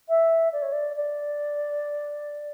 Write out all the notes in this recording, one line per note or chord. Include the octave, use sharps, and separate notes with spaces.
E5
D5
C#5
D5
D5